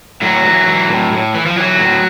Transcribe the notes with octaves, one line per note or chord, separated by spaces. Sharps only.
A2 F#3
E3
E3
A2
A2
E3
F3
E3 F#3
A2